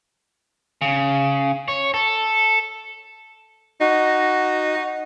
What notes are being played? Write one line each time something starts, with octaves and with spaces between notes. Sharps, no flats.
C#3
C#5
A4
D#4 F#4